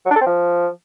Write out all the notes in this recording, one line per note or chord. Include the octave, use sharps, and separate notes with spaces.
F#3
D4
A4
C4
F3